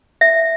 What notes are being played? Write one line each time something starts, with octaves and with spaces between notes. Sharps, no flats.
E5